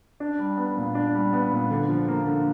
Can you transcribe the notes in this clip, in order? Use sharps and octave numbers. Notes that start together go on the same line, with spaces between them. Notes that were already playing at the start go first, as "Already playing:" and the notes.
D4
G3
B3
A#2
D4
G3
B3
A#2
D3
F3
A#3
D3